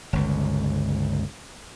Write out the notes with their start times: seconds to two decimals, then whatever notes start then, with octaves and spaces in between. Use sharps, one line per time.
0.13 G1 C#2